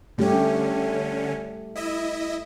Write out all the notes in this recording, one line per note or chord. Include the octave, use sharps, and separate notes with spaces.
D3 G3 A3 C#4 G4
E4 D#5 E5